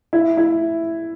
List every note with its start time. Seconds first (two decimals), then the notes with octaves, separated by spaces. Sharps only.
0.13 E4
0.37 E4